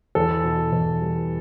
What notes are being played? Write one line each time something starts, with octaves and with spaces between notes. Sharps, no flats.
E2 A4
B2
E2
G3